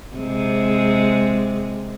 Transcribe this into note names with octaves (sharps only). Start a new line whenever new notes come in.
C3 G#3